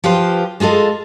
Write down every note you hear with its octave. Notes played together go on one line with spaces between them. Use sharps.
F3 F4 G4 B4 C5
G#3 F4 G#4 A4 D#5